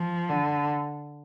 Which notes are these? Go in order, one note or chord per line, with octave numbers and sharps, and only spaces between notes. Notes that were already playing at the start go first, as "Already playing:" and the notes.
Already playing: F3
D3